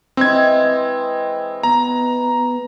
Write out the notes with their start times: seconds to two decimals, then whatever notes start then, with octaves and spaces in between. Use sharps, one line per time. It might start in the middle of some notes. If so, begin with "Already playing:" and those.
0.17 E3 G#3 C4 G#6
1.63 B3 A#5